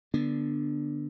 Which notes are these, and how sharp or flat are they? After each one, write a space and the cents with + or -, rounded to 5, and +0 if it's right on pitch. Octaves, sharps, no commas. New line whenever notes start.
D3 -5 B3 -20 D4 +0